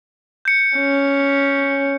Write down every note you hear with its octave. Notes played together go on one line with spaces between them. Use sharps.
G6 C#7
C#4